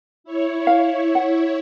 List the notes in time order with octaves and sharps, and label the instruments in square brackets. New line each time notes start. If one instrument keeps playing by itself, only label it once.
[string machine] E4 C#5
[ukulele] F5
F#5